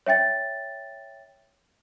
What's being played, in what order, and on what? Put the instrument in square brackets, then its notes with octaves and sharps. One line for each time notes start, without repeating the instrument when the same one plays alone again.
[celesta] C#5 E5 G5 A6